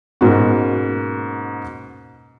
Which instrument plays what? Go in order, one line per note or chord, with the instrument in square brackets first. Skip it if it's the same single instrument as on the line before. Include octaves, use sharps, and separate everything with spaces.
[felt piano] G#2 B2 A#3 B3 C#4 F#4